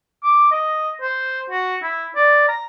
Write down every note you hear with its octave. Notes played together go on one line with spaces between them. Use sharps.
D6
D#5
C5
F#4
E4
D5
A#5